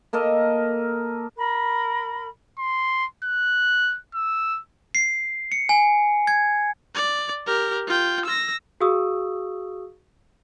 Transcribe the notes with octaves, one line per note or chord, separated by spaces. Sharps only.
A#3 A4 A#4 D#5
A#4 B5
C6
F#6
E6
C7
C#7
G#5
G#6
D5
G4 A#4
F4 G5
E6 A#6
F#4 G#4 F5 C#6 D#6 E6